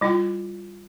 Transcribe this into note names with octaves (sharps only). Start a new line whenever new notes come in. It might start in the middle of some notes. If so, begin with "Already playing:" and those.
G3 E4 F4 G5